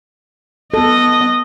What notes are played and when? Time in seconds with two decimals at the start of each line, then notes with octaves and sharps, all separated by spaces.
0.74 B3 A4 D#5